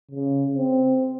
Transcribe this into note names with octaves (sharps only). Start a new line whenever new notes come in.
C#3
C4